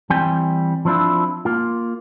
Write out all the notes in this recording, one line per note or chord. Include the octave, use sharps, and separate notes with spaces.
E3 G3 C4 G5 G#5
F3 C4 D4 E4 F4
A#3 F4